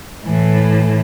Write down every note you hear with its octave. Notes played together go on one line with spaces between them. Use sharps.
A2 E3